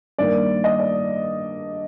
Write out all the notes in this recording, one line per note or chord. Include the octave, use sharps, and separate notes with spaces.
G2 D#3 A#3 D5
D#5
D5